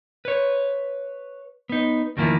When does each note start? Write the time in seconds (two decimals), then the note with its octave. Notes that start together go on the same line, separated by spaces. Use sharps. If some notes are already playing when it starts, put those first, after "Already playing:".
0.25 B4 C#5
1.69 B3 D#4
2.17 E2 D#3 F3 A#3 E4